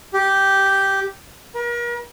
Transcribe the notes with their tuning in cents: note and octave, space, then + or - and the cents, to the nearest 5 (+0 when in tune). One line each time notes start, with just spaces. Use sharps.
G4 -5
A#4 +40